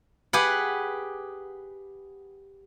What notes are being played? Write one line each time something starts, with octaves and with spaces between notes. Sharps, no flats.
G4 G#4 B4 F#5